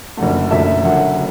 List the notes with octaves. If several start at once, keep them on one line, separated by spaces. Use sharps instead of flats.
F#1 F#2 D3 A3 F#5
F#1 F#2 D3 A3 E5
F#1 F#2 D3 A3 F#5